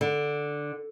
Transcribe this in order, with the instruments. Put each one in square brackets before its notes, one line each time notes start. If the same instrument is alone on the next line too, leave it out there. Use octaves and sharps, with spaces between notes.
[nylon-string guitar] D3